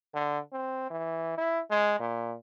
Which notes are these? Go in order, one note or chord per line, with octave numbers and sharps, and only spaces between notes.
D3
C4
E3
E4
G#3
A#2